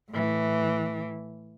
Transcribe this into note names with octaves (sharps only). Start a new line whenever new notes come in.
A2 E3